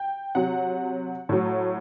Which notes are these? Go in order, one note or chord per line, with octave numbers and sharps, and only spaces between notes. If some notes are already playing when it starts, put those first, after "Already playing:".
Already playing: G5
C3 F#3 F#5
A2 F#3